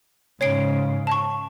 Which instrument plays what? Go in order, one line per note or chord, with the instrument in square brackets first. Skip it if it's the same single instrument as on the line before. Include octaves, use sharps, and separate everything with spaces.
[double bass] G#2 C#3 [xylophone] C#5 C7 D7
[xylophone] A5 C#6